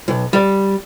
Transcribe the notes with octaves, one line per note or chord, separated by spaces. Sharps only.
B1
G3